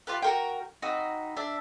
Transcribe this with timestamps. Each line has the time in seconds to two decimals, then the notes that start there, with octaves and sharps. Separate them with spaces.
0.07 F4 G4 B4
0.22 F#4 A#4 G5
0.82 C4 D#4 F#4 B5
1.37 D4 E5